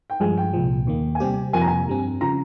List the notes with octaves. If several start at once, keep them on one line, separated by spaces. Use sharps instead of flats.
G5
G2 F3 G#3 G#5
G5
C2 A#2 F3
D#2 D#3 A#3
G#5
C3 G3 C4 G4 G5
F2 C3 F3 A#3 F4 G#5
A#5
G#5
G2 G3 C4
C#3 F3 A#5